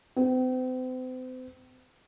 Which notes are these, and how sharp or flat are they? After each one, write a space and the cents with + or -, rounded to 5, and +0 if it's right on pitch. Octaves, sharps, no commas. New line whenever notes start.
C4 -40